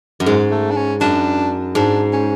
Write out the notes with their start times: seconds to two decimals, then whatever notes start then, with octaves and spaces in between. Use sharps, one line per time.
0.20 F#2
0.26 G#2 G#3
0.51 A3
0.71 D4
0.77 C#4
1.01 F#2 D4
1.75 G#2 D4
2.13 C#4